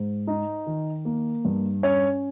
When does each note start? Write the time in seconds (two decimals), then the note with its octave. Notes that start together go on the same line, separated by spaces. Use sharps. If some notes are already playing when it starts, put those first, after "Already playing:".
Already playing: G#2
0.27 D#4
0.67 D#3
1.05 A#3
1.45 G2
1.83 C#4 C#5